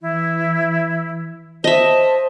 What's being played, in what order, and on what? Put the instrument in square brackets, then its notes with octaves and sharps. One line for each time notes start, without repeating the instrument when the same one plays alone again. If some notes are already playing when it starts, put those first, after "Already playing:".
[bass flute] E3 [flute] E4
[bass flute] C5 [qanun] D#5 E5 [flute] A5